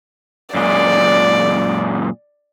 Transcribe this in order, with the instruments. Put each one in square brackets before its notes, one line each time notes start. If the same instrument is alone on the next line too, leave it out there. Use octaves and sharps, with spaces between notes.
[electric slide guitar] F#2 A#2 G#3 [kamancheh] D5